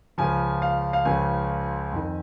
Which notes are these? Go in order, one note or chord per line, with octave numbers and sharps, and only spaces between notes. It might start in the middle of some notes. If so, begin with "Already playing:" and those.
C#2 C#3 F3 G#5
F5
F5
C#2 C#3 F3 G#5
F2 D#3